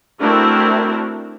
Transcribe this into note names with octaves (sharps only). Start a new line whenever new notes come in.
A3 C4 D4 E4 F#4 A#4